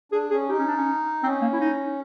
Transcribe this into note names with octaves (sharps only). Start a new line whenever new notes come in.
D4 G#4
C#4 G#4
D#4 G4
C#4
D4
C#4
C4 C#4
A#3
E4
D#4